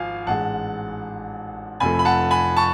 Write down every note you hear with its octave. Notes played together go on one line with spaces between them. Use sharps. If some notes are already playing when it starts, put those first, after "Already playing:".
Already playing: G#1 G#2 F3 F5 G#5
A1 G#2 G#3 F#5 A5
F1 F2 F3 A3 G#5 B5
B5
F#5 A5
G#5 B5
A5 C#6